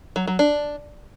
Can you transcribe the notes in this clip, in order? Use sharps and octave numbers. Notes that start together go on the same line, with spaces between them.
F#3
F#3
D4